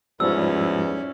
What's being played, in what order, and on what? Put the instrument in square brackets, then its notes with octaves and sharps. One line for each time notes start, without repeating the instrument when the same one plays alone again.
[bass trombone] E2 [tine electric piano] G#2 F3 G3 [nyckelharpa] C#4 D5 [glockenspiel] E6